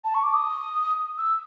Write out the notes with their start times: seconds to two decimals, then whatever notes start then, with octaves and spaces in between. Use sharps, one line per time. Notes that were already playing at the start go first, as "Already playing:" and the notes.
0.04 A5
0.14 C#6
0.23 D6
0.33 D#6
1.18 E6